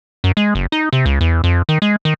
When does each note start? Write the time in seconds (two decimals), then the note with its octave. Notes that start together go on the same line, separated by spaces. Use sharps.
0.24 F#2
0.37 G#3
0.55 F#1
0.72 D#4
0.93 C3
1.06 C#2
1.21 E2
1.44 F2
1.69 D#3
1.82 G#3
2.05 D#3